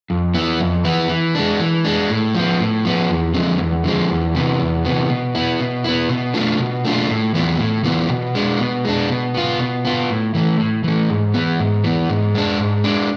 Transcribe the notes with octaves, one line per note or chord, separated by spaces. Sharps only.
F2
E3 B3 E4
F2
E3 B3 E4
E3
G#3 D4
E3
G#3 D4
A2
F3 B3
A2
F3 B3
E2
D3 F3 G#3 C4
E2
D3 F3 G#3 C4
E2
C3 E3 B3
E2
C3 E3 B3
B2
B3 E4
B2
B3 E4
B2
A3 D4 F4
B2
A3 D4 F4
A2
E3 B3 F4
A2
E3 B3 F4
B2
G#3 D4
B2
G#3 D4
B2
B3 F4
B2
B3 F4
A2
E3 A3
A2
E3 A3
G#2
E3 B3
G#2
E3 B3
G#2
G#3 D4
G#2
G#3 D4